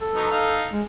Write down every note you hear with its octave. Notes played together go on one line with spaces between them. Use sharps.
A4
F#3 B3 D#4
D#4 F5
G#3